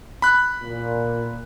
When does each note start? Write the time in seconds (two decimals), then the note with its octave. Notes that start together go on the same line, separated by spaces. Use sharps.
0.22 B5 F#6
0.64 A#2